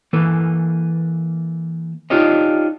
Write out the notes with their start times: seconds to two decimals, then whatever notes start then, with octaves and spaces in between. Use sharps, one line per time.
0.13 E3 A#3 A4 B4
2.10 D4 D#4 F4 G4 C#5 D#5